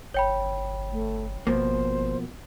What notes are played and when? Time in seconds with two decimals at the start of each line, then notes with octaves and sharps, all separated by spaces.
0.14 G1 C#5 G5 B5
0.92 A3
1.47 G#1 B2 F3 A#3 C5